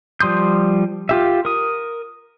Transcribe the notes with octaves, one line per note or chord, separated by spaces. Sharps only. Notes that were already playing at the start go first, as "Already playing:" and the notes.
F3 G3 C6 D#6 G6
F4 G4 E5
A#4 D#6